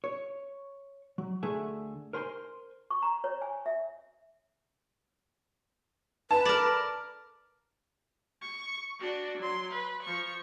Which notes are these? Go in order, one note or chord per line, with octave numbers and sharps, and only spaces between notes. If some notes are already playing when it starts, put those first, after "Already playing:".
C#5
F#3
D2 D3 A3 G#4 E5 G#5
A#4 C5 G#5 B5 C6
C#6
A#5
C#5
G#5
E5
B4 A5
A#4 D5
C#6
D4 F#4
F#3 C6
B4
F3 C#6